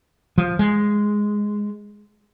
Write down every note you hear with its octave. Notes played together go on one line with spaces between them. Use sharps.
F3
G#3